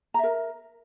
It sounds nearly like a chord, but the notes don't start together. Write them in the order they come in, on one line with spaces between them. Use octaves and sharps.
A#5 E5 A#4